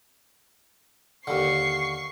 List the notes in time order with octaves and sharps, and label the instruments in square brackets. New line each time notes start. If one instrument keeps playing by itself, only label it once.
[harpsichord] D#2 D3 [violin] C#6 C7